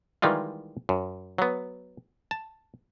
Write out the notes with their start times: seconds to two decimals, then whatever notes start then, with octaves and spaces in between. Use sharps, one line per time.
0.22 D#3 E3 G3 G#3 F4
0.89 F#2
1.38 F#3 B3
2.31 A5